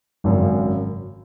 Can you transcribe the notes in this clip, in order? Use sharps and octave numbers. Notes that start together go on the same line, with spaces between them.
G#1 F#2 C#3